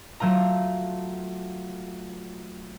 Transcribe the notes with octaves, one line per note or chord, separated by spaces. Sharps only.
F#3 A3 F4 A#5